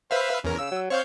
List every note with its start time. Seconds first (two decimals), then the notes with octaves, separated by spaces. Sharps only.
0.11 B4 C5 E5 F5
0.44 E2 C#4 A#4
0.58 C#3 E6
0.71 F#3
0.90 C4 C#5 F5 G6